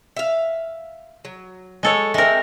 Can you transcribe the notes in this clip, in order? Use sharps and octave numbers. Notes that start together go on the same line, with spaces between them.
E5 F5
F#3
G#3 A4 C#5
G#3 C4 A#4 E5